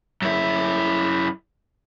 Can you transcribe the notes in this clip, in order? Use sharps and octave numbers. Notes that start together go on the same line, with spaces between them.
F#2 E4